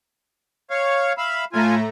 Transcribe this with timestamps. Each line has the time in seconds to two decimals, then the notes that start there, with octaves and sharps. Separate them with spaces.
0.71 C#5 F5
1.18 E5 F5 B5
1.53 A2 A3 F4 G#5 A#5